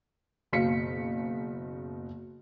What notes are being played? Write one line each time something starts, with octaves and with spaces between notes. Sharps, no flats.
F#1 B2 F5 B6 C#7